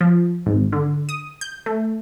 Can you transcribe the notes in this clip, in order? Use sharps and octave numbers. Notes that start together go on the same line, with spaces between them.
F3
G#1
D3
D#6
G6
A3